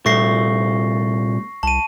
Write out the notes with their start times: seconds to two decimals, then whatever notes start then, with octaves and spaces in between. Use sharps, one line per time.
0.06 C2 A#2 A3 C#6 A#6 C7
1.63 C2 A5 D#7